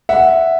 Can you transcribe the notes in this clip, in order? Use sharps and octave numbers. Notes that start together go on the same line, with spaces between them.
E5 F#5